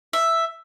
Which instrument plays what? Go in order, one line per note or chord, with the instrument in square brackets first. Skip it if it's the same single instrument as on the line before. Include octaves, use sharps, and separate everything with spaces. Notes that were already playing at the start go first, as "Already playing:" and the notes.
[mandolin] E5